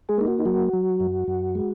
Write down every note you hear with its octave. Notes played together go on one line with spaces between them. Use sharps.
G#3 G#4
A#3 D#4
F#4
D#4
F#3 F#4
F#3
F#2
F#2
G#3